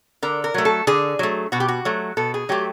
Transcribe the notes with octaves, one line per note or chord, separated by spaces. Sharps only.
D3 A#4
A#4
F#3 A3
A4
D3 G#4
F#3 A3
B2 F#4
G4
F#4
F#3 A3
B2 A4
G#4
F#3 A3 G4